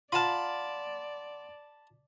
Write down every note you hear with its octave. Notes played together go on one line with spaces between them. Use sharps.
F4 A#4 D5 F5 F#5 A5 B5 C6